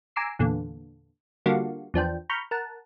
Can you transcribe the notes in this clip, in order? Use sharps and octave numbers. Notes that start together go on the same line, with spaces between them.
G#5 A#5 D6 E6 C7
E2 A#2 D3
D3 G3 A#3 F4 F#4
E2 F3 D4 G5
A#5 B5 C#6 F6 G6
A#4 F#5 A5